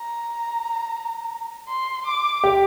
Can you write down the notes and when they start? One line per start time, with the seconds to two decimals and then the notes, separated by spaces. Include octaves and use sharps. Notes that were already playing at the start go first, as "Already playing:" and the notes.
Already playing: A#5
1.69 C6
2.06 D6
2.44 G4